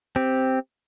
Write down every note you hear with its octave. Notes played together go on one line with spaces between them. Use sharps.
C4 G4